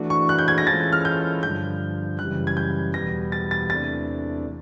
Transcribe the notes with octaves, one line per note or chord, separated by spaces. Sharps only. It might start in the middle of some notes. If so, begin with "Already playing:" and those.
Already playing: E3 A3 D4 F#4
C#6
F#6
G6
G#6
A#6
E3 G#3 C#4 F4 A4 A6
F6
G6
G2 D3 F3 G6
F#2 C#3 E3 G3 F#6
G#6
G6
E2 B2 G3 B3 A#6
A6
A6
E2 C3 E3 A3 D4 A6